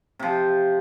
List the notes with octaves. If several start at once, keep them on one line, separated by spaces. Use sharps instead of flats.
C3 F3